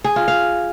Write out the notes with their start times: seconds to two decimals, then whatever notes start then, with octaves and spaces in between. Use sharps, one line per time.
0.04 G#4
0.16 F4
0.28 F5